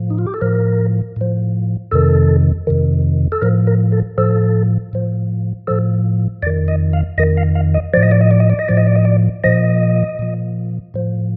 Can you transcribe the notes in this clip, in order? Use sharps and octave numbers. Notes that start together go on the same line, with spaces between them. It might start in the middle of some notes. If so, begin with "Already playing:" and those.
Already playing: A2 F3
D#4
F4
G4
A4
A2 F3 A#4
A2 F3
F2 C3 D#3 A4
F2 C3 D#3
A4
A2 F3 A#4
A#4
A4
A2 F3 A4
A2 F3
A2 F3 A4
F2 D#3 D5
D#5
F5
F2 D#3 D#5
F5
F5
D#5
A2 F3 D5
D#5
D5
D#5
D5
D#5
D5
D#5
A2 F3 D5
D#5
D5
D#5
D5
A#2 F3 D#5
A#2 F3
A2 F3